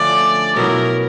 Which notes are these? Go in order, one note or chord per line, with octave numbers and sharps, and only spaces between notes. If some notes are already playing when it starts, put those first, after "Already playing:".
Already playing: D3 F3 A3 C#4 D5
B2 F#3 B3 E4 A#4